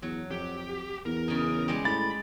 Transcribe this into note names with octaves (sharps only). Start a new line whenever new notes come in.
E2 F#3
F2 G4
E2 A#4
C#3 D#4
G3 G#3 G4
A2 B5 A6